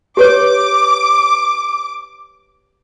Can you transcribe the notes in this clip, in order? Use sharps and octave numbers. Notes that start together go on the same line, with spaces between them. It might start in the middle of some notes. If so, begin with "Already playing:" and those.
G4 B4 C#5 D6